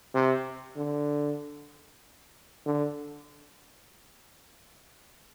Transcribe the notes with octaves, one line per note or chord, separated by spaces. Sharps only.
C3
D3
D3